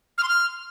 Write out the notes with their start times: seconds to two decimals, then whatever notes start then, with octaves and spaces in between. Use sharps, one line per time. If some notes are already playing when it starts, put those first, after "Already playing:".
0.18 F6
0.23 C6
0.28 F6